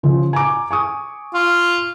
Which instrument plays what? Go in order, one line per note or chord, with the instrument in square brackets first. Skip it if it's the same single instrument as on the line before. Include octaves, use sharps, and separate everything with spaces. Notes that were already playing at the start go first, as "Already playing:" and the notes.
[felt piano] C#3 F3
G#5 A#5 D6
G#5 C#6 D#6
[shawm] F4